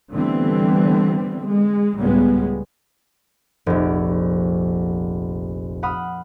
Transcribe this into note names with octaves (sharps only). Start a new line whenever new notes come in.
D3 E3 G3 A3 B3 C4
G#3
C#2 A2 C#3 G3 G#3 B3
F1 A#1
F#5 B5 D#6 F6